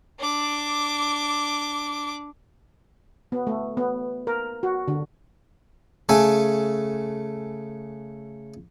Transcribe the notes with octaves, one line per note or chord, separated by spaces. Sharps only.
D4 D6
B3
A3
B3
A#4
F#4
D3
C#3 A3 A4 G#5